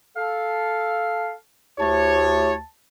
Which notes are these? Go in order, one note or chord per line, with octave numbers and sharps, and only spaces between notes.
A4 F5
D2 E4 G4 C#5 A5